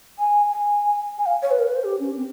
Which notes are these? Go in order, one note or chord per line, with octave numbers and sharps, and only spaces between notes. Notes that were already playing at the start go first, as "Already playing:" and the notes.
G#5
G#5
G#5
F5
C#5
B4
A#4
B4
C5
G4
C#4
C4